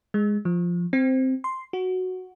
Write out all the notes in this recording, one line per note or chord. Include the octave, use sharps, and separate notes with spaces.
G#3
F3
C4
C6
F#4